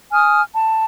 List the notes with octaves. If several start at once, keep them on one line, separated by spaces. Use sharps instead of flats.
G#5 D#6 F6
A5